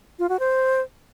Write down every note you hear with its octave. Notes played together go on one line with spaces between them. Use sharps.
F4
F#4
C5